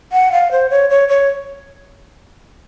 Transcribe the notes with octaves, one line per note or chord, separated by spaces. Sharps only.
F#5
F5
C5
C#5
C#5
C#5